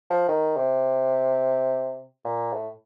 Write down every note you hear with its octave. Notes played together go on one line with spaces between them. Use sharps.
F3
D#3
C3
A#2
A2